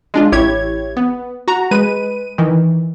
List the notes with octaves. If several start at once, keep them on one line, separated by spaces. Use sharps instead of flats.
G#3 D4 F4
A1 E4 G4 C#5 G#6
B3
F#4 A#5
G#3 B4 D#7
D#3 E3